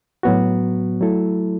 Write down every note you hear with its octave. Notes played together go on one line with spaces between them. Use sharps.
A2 F#3 B3 F#4
F#3 A3 E4 A4